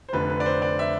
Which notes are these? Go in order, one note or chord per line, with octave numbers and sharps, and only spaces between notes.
C5
F1 F2 D3 B4
B4
D5
C5
D5
E5